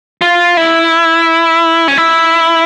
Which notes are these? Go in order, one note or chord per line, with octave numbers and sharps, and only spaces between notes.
F4
E4
C#4
E4